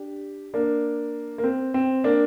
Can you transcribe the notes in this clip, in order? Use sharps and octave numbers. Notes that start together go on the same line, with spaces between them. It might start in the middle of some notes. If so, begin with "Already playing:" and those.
Already playing: D4 G4
A#3 D4
A#3
C4
C4
A#3 D4